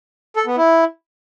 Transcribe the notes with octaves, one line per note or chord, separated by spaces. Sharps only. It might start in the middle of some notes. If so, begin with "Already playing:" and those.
A4
B3
E4